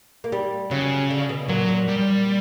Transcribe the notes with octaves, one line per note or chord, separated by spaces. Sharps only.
A#3
G3
C#3 F#3
D3
B2
A#2 F#3
A#2
G3